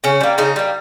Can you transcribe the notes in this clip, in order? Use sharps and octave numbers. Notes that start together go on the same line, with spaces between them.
C#3 C#4
G3 A#3
C#3 D#4
G3 A#3